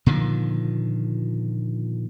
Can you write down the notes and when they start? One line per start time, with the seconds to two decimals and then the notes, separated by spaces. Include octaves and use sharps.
0.06 A#2 D3 D#3 F3